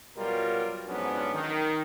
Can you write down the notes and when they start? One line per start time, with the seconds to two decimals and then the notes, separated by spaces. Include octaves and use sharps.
0.17 B2 F#3 G3 F4 A#4
0.87 F2 G#2 F#3 B3 C#4 D4
1.34 D#3